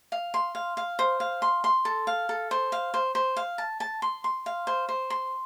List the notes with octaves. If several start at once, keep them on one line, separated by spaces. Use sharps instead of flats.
F5
C6
F5
F5
C5
F5
C6
C6
A4
F5
A4
C5
F5
C5
C5
F5
A5
A5
C6
C6
F5
C5
C5
C6